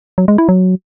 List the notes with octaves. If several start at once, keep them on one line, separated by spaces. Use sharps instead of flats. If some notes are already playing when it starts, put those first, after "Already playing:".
F#3
G#3
E4
F#3